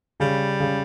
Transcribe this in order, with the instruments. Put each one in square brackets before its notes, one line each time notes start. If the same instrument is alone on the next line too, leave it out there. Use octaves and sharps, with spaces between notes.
[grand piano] C#3 [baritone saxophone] G3
[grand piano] C#3